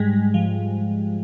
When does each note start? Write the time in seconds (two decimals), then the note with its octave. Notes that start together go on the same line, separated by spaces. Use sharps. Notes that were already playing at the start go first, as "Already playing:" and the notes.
Already playing: G#2 G3 G#3
0.14 G#2
0.34 F3